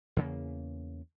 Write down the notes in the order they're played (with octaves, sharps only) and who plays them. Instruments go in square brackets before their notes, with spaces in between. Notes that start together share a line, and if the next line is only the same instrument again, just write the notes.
[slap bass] E2 C#3 A#3